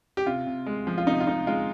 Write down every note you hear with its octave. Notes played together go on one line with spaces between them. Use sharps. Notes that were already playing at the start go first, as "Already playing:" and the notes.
G4
C3 F4
C3
G#3
F3
F4
C3 D#4
F4
C3 D#4
G#3 F4